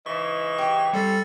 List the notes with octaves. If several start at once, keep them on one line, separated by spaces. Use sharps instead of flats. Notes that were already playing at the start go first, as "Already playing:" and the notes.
G#2 C#3 E3 D#5 C#6
G4
G3 C4 C#4 A4 A6